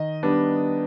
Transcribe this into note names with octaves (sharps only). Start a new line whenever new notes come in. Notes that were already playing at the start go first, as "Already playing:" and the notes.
Already playing: D#3 D#5
G3 B3 D4